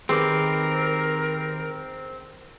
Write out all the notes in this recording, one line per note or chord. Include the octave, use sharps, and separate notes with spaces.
D#3 C4 G4 G#4 A#4 B4 D6